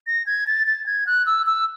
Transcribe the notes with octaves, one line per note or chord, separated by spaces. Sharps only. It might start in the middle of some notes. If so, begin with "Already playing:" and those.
A#6
G#6
A6
A6
G#6
F#6
E6
E6